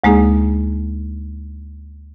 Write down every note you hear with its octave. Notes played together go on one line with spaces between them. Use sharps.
D2 G#3 A#3 D#4 G#4